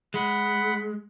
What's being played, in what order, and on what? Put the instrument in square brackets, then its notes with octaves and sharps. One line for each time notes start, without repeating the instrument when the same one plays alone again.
[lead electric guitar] G#3 [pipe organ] F#5 B5 C6